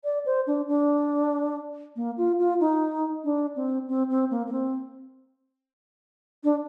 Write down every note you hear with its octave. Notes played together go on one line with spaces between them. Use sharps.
D5
C5
D4
D4
A#3
F4
F4
D#4
D4
C4
C4
C4
A#3
A#3
C4
D4